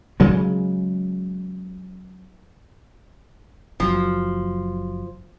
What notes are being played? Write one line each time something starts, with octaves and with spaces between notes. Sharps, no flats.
C#3 F#3 G#3
F#1 F3 F#3